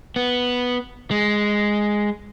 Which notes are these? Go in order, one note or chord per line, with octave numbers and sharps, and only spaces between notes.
B3
G#3